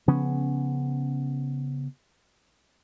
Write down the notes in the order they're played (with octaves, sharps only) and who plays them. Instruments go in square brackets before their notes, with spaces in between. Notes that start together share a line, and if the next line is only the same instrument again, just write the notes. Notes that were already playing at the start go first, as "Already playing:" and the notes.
[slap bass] C#3 F3 B3 C#4